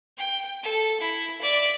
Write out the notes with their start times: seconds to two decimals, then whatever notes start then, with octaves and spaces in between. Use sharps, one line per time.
0.18 G5
0.63 A4
1.01 E4
1.41 D5 E5